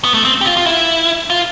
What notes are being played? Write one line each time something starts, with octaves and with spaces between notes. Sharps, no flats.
B3
A3
C4
G4
F4
F4
E4
F4